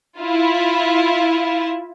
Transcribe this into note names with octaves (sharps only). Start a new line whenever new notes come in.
E4 F4